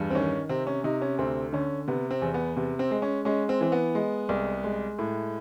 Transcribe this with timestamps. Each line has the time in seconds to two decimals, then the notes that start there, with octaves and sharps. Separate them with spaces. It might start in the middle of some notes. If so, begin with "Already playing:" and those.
Already playing: E2 G2
0.10 C4
0.15 D#3 C#4
0.49 C3 C4
0.67 C#4
0.84 C3 D#4
1.02 C#4
1.18 D2 C4
1.53 D3 C#4
1.88 C3 B3
2.11 C4
2.22 E2
2.34 B3
2.56 C3 B3
2.79 C4
2.91 G#3
3.02 C#4
3.25 G#3 C#4
3.49 C4
3.61 E3 C4
3.72 B3
3.95 G#3
4.29 C2
4.64 G#3
4.99 A2